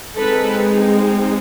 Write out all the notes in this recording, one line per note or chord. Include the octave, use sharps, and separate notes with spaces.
G#3 C4 D#4 A4 B4